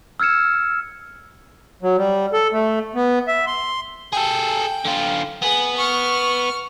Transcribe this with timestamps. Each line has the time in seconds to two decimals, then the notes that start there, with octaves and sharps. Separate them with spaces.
0.20 E6 F6 G#6 C#7 E7
1.83 F#3
1.98 G3
2.33 A4
2.52 A3
2.95 B3
3.28 E5
3.47 C6
4.13 G#4 A4 G5
4.85 D3 F4
5.42 B3 G#4
5.77 C#6 F6